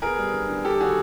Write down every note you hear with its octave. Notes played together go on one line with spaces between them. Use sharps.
B3 G#4 A#4
G3
D3
D3
G3 G4 A4
D#3 F#4 G#4